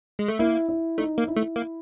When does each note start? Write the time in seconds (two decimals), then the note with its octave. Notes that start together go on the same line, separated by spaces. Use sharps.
0.19 G#3
0.28 A3
0.39 A#3 E4
0.69 E4
0.98 A3 D#4
1.18 A#3
1.27 E4
1.36 A3
1.56 A#3